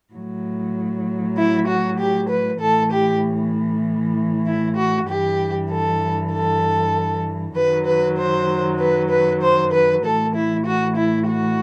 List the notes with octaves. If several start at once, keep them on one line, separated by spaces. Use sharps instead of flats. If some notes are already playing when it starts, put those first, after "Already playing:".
A2 F#3
E4
F#4
G4
B4
A2 E3 A4
G4
E4
F#4
G2 E3 G4
A4
A4
F#2 D#3 F#3 B4
B4
C5
B4
B4
C5
B4
A2 E3 A4
E4
F#4
E4
F#4